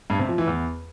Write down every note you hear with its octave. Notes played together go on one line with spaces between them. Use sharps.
G2
C3
F3
E3
E2